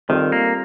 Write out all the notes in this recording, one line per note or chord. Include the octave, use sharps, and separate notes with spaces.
D#3 G3 C4 F4 A4 C5
A#3